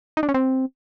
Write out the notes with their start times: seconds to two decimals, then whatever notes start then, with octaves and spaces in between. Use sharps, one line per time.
0.17 D#4
0.23 D4
0.29 C#4
0.34 C4